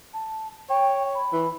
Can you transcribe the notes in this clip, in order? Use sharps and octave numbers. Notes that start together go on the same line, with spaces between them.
A5
C#5 G5
B5
E3